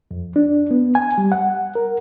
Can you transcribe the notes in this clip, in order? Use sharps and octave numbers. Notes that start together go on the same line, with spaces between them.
F2
D4
B3
G#5
G3
F#5
A#4